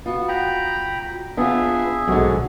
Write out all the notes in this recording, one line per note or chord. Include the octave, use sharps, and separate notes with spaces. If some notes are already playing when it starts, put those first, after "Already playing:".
B3 F4 F#4
F#5 G5 A#5 B5
B3 D4 F4 G#4 E5
B1 G#2 D3 G#3 F#4